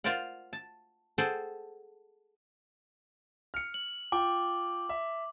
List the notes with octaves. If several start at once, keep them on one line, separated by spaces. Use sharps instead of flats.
F4 A#4 C5 D5 F#5
A5
G#4 A4 C5 F#5 G5
F6 C#7
F#7
F4 G5 D6
E5